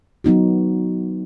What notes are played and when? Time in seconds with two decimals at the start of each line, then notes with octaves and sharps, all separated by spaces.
0.24 F#3 B3 D#4 F#4